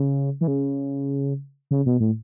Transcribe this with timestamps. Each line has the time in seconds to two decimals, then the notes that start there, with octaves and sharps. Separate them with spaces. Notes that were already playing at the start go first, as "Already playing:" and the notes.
Already playing: C#3
0.41 E3
0.48 C#3
1.71 C#3
1.86 B2
2.00 A2